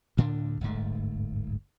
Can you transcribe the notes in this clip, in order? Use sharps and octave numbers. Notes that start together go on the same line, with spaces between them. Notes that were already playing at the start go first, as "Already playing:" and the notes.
D2 A2 D3 D4
D1 G1 G#2 A3